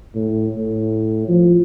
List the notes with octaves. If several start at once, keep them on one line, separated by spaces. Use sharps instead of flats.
A2
A2
F3